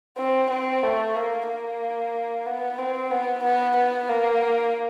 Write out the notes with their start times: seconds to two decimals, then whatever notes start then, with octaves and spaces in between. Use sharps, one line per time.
0.17 C4
0.50 C4
0.83 A3
1.16 A#3
1.48 A#3
2.46 B3
2.78 C4
3.11 B3
3.43 B3
3.76 B3
4.09 A#3